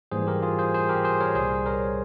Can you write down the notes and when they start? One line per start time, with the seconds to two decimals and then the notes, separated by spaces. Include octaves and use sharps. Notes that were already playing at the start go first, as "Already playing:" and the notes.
0.11 G#2 E3 G3 A#3 G#4 C5
0.27 G4 A#4
0.43 F4 G#4
0.58 G#4 C5
0.74 G#4 C5
0.89 G4 A#4
1.04 G#4 C5
1.20 A#4 C#5
1.35 C2 A#2 G3 G#4 C5
1.66 A#4 C#5